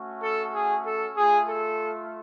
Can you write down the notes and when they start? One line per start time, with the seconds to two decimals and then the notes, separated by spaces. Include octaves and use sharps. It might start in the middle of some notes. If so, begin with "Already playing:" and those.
Already playing: A3 C#4 F#4
0.21 A4
0.53 G#4
0.84 A4
1.16 A3 F4 G#4
1.48 A4